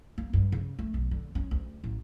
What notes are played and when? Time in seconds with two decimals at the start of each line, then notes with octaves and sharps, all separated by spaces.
0.18 A#3
0.33 G2
0.52 C#3
0.79 A3
0.94 B1
1.11 D3
1.35 C#4
1.51 D2
1.84 A1